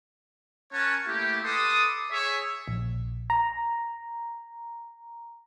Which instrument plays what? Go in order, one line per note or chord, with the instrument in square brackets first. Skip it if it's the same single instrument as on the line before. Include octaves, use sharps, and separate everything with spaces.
[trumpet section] C#4 A#4 C#5 F#5 G#5 A5
A3 A#3 E4 G4
A4 B4 C6 D6 D#6
G#4 C#5 E5
[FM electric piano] A#1
A#5